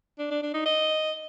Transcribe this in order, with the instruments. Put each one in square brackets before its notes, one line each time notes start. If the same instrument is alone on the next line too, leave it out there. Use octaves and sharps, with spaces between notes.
[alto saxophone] D4
D4
D4
D#4
D#5